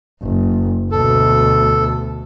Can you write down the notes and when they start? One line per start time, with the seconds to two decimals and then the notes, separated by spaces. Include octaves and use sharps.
0.22 F#1
0.91 D2 B2 A4